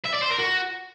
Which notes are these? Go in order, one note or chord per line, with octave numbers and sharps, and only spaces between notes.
E5
D5
C5
A#4
F#4